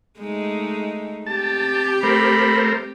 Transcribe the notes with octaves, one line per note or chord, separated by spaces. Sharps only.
G#3 A3 D#4
C4 G4 A5
A3 A#4 C5 B5